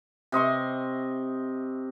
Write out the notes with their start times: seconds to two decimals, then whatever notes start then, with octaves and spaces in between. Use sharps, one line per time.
0.32 C3 D#5 C6 C#6